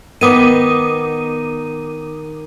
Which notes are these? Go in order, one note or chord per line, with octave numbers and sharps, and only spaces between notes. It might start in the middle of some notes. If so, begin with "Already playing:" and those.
D#3 B3 D6 D#6 D#7